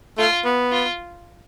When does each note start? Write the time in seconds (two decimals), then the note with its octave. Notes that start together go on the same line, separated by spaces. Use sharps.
0.18 A3 F4
0.45 B3
0.72 F4